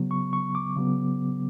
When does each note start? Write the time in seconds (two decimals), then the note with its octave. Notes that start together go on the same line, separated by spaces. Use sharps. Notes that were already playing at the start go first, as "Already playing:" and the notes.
Already playing: C#3 F#3 B3
0.11 C#6
0.33 C#6
0.55 D6
0.77 C#3 F#3 B3